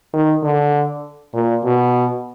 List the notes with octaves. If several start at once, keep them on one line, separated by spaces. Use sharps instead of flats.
D#3
D3
A#2
B2